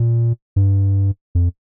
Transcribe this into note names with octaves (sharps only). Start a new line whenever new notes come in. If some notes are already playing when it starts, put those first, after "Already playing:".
Already playing: A#2
G2
F2